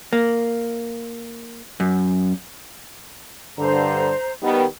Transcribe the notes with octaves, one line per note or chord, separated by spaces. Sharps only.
A#3
F#2
G2 D3 C5 A#5
D#3 G3 B3